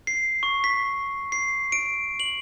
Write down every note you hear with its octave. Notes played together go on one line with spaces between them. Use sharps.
C7
C#6
B6
C7
D7
F#7